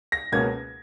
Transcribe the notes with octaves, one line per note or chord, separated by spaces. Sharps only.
A#6
C#2 B2 A#3 C#4 G#6